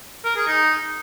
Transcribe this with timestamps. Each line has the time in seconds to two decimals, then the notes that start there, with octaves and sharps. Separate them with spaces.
0.25 A#4
0.36 G#4
0.47 D#4